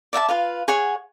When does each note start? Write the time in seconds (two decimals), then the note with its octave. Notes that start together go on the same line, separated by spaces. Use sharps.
0.13 D5 E5 F#5 A5
0.29 F4 B4 F5
0.68 G#4 C#5 F#5